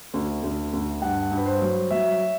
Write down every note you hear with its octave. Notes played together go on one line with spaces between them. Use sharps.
D2
D2
D2
G2 F#5
G2
B4
C5
F#3
F#3 E5